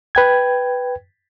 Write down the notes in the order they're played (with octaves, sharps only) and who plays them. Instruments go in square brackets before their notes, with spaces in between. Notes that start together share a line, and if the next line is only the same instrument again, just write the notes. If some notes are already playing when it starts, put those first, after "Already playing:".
[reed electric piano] B4 G5 G#6